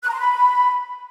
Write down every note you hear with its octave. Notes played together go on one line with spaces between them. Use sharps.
F#6
A#5
C6
B5